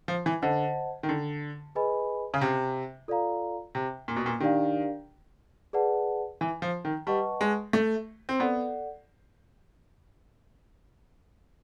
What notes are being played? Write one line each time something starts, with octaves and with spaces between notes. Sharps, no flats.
F3
E3
D3 C5 D#5 F#5 A5
D#3
D3
G#4 B4 D#5 G#5 B5
C#3
C3
F4 A4 D5 F5 A#5
C3
A#2
B2
A#2
D#3 D4 G4 A#4 D5 F5
G#4 B4 D5 F#5 A5
E3
F3
D#3
G3 B4 D#5 F#5 A5 C#6
G#3
A3
C4
B3 A4 D5 F#5